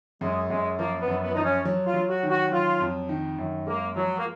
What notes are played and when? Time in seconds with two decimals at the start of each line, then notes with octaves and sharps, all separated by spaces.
0.21 F#2 G#3
0.49 F#2 G#3
0.79 F3 A#3
1.00 B3
1.08 F#2
1.22 B3
1.34 F3 D#4
1.44 C#4
1.65 F#3
1.86 F4
1.94 F#3
2.09 F#4
2.23 D#3
2.30 F#4
2.52 F#3 F4
2.80 F2
3.09 D#3
3.38 F#2
3.67 G#3 A#3
3.96 F3 F#3
4.18 A#3